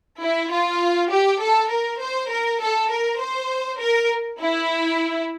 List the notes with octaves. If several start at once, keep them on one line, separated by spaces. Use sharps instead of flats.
E4
F4
G4
A4
A#4
C5
A#4
A4
A#4
C5
A#4
E4